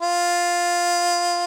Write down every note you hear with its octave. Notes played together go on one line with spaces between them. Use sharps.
F4